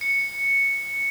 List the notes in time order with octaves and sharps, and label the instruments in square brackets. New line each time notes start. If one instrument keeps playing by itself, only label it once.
[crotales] C#7